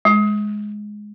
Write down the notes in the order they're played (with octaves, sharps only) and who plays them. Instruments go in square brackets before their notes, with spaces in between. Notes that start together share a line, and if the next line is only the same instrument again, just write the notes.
[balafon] G#3